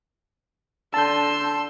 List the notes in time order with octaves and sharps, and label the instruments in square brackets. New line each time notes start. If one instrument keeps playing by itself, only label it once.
[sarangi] D3 [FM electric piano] A5 G6 [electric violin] C6 E6